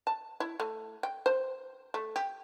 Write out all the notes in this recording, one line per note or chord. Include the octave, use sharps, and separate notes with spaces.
A5
E4
A3
G5
C5
A3
G4